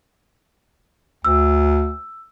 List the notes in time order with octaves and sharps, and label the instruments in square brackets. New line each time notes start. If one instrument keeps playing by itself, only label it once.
[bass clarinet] D2 [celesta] E6